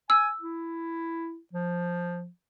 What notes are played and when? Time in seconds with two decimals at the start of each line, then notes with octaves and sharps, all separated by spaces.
0.10 G#5 E6
0.41 E4
1.53 F3